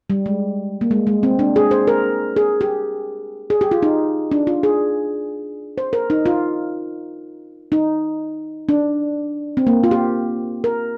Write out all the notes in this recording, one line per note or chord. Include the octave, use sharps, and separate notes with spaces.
G3
G#3
A#3
G#3
G#3
C4
D4
G#4
C5
A#4
G#4
G4
G#4
G4
F4
D#4
D4
F4
G#4
C5
A#4
D#4
F4
D#4
D4
C4
A#3
F4
G4
A#4